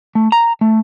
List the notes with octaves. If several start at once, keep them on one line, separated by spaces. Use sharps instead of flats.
A3
A#5
A3